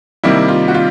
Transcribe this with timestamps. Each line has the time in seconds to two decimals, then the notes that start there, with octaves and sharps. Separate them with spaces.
0.23 C3 D#3 G3 A#3 E4
0.48 F4
0.68 F#4
0.74 F4